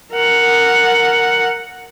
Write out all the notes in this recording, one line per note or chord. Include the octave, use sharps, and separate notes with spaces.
A#4 F#5